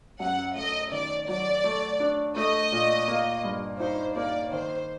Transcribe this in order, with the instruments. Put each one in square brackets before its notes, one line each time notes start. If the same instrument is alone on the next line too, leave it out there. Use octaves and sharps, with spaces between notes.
[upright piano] F#2 [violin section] F#5
[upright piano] A3 [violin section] D#5
[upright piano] D#3 [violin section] D5
[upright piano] F#3 [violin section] D5
[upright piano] A3
D4
[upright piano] A3 [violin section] D#5
[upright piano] A#2
A#3
G2
[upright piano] D#4 [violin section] C5
[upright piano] A#3 [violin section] D5
[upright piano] D#3 [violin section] C5